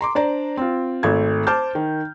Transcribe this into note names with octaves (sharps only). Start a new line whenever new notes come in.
A#5 C6 D6
D4 C5 D5 A#5
C4 F4
G#1 A3 G#6
C5 A5 D6 F6 G6
D#3